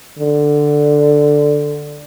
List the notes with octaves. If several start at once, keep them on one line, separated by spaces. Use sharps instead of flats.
D3